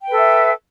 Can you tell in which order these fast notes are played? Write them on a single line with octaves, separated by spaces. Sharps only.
G5 B4 A4 E5